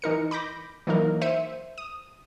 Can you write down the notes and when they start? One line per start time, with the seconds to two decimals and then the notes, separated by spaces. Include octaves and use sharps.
0.02 E3 D#4 A#4 C#7
0.31 B5 D6 G6 A#6
0.87 E3 F#3 A#3 D#4 A#4
1.21 C5 E5 C#7 D#7
1.78 D#6